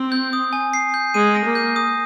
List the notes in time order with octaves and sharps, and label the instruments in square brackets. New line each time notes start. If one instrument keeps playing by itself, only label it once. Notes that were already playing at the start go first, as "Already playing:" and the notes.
Already playing: [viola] C4
[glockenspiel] G6
D#6
G#5
C7
G6
[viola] G#3 [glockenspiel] D#7
[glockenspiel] A#6
[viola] A#3
[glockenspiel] G6
D#6